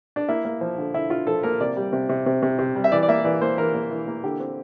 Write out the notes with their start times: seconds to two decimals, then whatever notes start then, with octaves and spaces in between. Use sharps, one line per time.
0.16 D4
0.28 A#3 E4
0.45 A#3
0.61 F3
0.78 D3
0.94 D3 E4
1.10 D3 F4
1.27 F3 A4
1.43 A#3 A#4
1.60 C3 D5
1.77 G3
1.93 C3
2.09 C3
2.26 C3
2.42 C3
2.59 C3
2.76 G3
2.84 E5
2.92 E3 D5
3.03 D5
3.08 A#3 E5
3.25 E3 D5
3.41 A#3 C5
3.58 E3 A#4
3.74 A#3
3.91 E3
4.07 A#3
4.24 D3 G4
4.40 C4